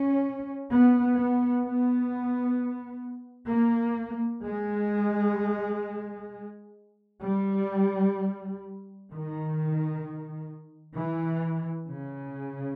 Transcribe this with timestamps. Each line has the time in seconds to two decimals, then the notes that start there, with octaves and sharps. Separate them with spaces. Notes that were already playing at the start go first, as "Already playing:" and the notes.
Already playing: C#4
0.70 B3
1.17 B3
1.64 B3
3.50 A#3
4.44 G#3
7.23 G3
9.10 D#3
10.97 E3
11.90 C#3